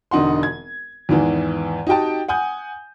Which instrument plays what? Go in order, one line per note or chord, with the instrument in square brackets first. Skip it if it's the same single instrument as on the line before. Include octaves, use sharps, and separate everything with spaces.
[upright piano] E1 D3 D#4 F#5 C6
G#6
E2 G#2 D#3 E3
D#4 F#4 G4 G5 A5
F#5 G#5 D#6 G6